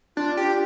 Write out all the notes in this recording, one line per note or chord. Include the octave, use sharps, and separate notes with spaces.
D4 F4
G4